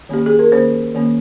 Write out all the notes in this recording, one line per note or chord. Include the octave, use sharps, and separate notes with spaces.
D#3 A#3 C#4 G4
G#4
A#4
D#3 A#3 C#4 C5
D#3 A#3 C#4